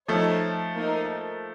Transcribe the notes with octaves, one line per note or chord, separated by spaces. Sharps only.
F3 A3 D#4 A4 C#5 A5
A#3 D#4 A#4